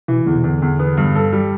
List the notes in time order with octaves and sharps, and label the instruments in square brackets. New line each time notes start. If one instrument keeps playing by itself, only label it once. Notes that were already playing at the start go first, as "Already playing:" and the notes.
[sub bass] B2 [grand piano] E3
[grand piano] E2 [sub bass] D3
[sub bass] B2
[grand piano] E2 [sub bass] D3
[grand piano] E2
B3
G2
A4
G3